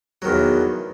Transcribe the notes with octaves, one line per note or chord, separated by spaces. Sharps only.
E2 D#3 F#3